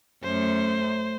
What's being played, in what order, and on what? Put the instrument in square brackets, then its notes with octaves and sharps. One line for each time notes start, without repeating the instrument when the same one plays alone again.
[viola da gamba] F#2 A3 [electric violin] C5